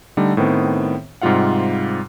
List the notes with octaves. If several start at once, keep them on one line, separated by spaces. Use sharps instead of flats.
D3 G3 A3 D#4
A2 D#3 B3 C4
G#2 C3 G3 F4 F5 F#5